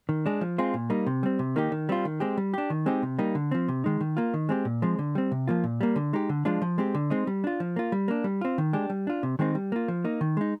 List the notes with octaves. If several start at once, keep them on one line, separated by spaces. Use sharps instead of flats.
D#3
G#3 D4
F3
G#3 C4 F4
A#2
G3 A#3 D#4
C3
G3 C4
C3
D#3 A#3 D#4 G4
D#3
G3 C4 F4
D#3
G#3 C4 G4
G3
D4 G4
D#3
G#3 C4 D#4 G4
C3
G3 A#3 D#4
D3
F3 C4
C3
D#3 G#3 D#4
D#3
A#3 F4
D#3
G#3 C4 G4
A#2
F3 G#3 C4
D3
G3 C4
C3
F3 A#3 F4
A#2
G3 A#3
D3
G#3 D#4 G4
D3
F3 G#3 D4 F4
F3
G#3 C4 G4
D3
G#3 C4 D#4
G3
D4 F4
F3
A#3 F4
G3
A#3 D4
G3
C4 F4
D#3
G#3 D4 G4
G3
D4 F4
C3
D#3 G#3 C4 D#4
G3
A#3 F4
F3
A#3 D#4
D#3
G#3 D#4